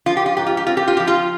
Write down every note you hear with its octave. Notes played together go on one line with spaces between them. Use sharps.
F3 F4
G4
F4
G#2 G4
F4
G4
C4 F4
G4
F4
F3 G4
F4